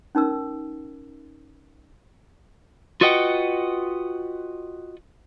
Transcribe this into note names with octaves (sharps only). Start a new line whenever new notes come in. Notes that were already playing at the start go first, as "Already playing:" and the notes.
C#4 D#4 A#4 E6
F4 F#4 B4 D#5 F#5 G5